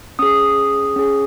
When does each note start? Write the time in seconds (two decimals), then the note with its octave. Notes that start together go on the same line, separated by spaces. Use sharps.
0.19 C#4 G#4 D#6
0.96 C#4 G#4